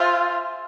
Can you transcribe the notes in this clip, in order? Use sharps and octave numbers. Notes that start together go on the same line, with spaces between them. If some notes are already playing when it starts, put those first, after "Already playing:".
Already playing: F4 G#4 C5 E5